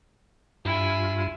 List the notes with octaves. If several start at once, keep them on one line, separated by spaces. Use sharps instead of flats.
G2 E4 F4 G#5